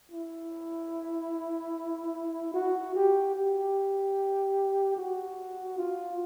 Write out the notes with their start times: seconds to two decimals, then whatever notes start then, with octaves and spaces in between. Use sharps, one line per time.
0.12 E4
2.54 F#4
2.95 G4
3.35 G4
4.97 F#4
5.78 F4